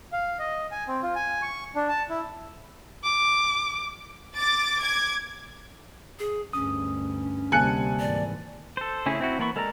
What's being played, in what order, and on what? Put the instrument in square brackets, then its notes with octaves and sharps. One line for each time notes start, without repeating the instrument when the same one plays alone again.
[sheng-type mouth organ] F5
D#5
G#5
C4
F4
G#5
C#6
D4
A5
E4
[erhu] D6
[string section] D6 A6
D6 G#6
[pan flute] G#4
[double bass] D2 G2 [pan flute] C#4 [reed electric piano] D#6
[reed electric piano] D2 A#3 A5 [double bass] C3 G3 [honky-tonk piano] G#5 F#6 C#7
[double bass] G#1 E3 [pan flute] D5
[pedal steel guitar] A4 C5
C#3 A3 C#4 E4 G#4
C4 E4 F#4
E3 A#3 B3 B5 C#6
G#3 A4 A#4 D5 A#5